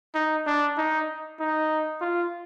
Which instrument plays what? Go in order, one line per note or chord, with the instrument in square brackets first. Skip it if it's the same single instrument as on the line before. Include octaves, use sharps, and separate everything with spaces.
[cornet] D#4
D4
D#4
D#4
F4